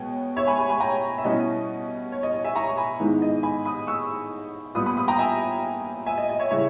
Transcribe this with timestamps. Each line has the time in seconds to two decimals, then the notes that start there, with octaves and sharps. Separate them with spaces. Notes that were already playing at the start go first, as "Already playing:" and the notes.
Already playing: B2 G#3 B3 C#5 G5
0.36 C#5 E5
0.47 G#5 B5
0.58 G#5 B5
0.69 G#5 B5
0.80 G5 A#5
1.18 E5
1.24 B2 G3 C#4 E4 D#5
2.12 C#5
2.23 D#5
2.34 D#5
2.44 E5 G#5
2.56 A#5 C#6
2.67 C#6
2.77 G#5 B5
3.00 G#2 D#3 G#3 B3 E4
3.22 D#5
3.43 G#5 B5
3.65 B5 D#6
3.87 C#6 E6
4.75 A#2 G3 B3 B5 D#6
4.86 B5 D#6
4.97 B5 D#6
5.08 G5 A#5
5.19 E5 G#5
6.06 E5 G#5
6.18 D#5
6.29 D#5
6.40 C#5 E5
6.51 C#3 G3 C#4 E4 C#5 E5